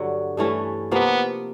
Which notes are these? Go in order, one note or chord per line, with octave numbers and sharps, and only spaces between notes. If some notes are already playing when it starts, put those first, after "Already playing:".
Already playing: G2 D3 F#3
G2 E3 A3 C#4
C3 F3 A#3 B3